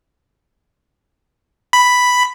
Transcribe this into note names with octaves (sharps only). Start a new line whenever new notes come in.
B5